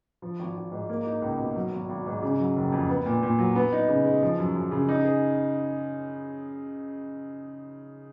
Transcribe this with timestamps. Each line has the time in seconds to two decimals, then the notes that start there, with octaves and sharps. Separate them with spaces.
0.22 F3
0.39 G#1
0.56 G#1
0.72 G#2
0.89 A#3
1.06 D#4
1.22 C#2
1.39 B2
1.56 F#3
1.72 G#1
1.89 G#1
2.06 G#2
2.22 C#3
2.39 F#3
2.56 F#1
2.72 F2
2.89 B3
3.06 A#2
3.23 A#2
3.38 F#3
3.55 B3
3.72 D#4
3.88 C#3
4.05 G#3
4.22 F3
4.38 F#2
4.55 F#2
4.71 C#3
4.88 D#4
5.05 G#4